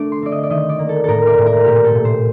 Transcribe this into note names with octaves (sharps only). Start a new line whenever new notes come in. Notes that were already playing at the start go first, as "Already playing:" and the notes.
Already playing: D3 A3 D6
C6
C4 D5
D#5
D5
D#3 D#5
D5
A#3
A4
A2 A4 A#4
D5
A2
A#4
A#2 G4
A4
A#2
C5